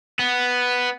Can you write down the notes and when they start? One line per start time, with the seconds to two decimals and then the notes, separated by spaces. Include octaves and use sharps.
0.19 B3